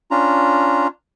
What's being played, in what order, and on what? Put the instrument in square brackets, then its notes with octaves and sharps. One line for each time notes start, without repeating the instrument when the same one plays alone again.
[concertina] C#4 D4 F4 A#5